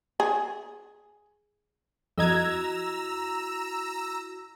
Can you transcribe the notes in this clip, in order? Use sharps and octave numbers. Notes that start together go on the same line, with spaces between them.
G#4
F2 E4 F#4 D#5 A#5 E6 G#6